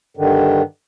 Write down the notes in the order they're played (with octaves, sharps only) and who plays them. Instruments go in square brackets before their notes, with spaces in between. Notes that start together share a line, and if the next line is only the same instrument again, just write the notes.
[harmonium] G2 D3 D#3